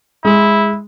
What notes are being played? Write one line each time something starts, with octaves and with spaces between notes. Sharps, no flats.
G#3 E4